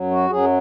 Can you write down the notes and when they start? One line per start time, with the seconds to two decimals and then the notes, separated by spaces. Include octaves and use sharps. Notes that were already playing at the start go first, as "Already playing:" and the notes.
Already playing: F#2 F#3
0.11 F#4
0.30 F#2 F#3 G#4